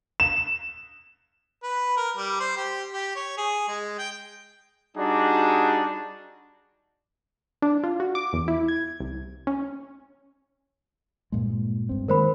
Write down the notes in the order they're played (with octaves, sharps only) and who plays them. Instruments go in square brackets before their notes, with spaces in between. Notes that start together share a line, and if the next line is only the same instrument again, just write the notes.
[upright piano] E7
[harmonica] B4
A#4
G3
C5
G4
G4
C#5
G#4
G#3
G5
[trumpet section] G3 D4 D#4 F#4 G#4
[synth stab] D4
F4
F#4
D6
E2
E4
G#6
C2
C#4
[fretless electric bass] G2 A#2 G#3
G2 C4
[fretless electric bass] D#3 G#3 A#3 [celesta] A#4 C5 B5